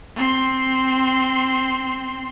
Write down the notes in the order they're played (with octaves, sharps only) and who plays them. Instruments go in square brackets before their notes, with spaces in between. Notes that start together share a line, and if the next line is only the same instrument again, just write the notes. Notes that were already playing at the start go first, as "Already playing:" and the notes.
[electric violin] C4 C6